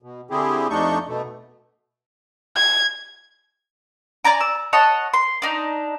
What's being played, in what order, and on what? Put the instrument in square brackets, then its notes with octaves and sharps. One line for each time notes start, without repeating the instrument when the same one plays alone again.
[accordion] B2
D3 C4 E4 G4 G#4
F2 A3 D4 D#4 C#6 G6
B2 A3
[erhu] G#6
[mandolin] D5 G#5 A#5 D6
E6
C#5 D#5 F#5 A5
C6
D4 D#4